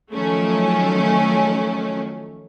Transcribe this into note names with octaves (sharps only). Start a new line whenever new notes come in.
D#3 F3 F#3 A3 C#4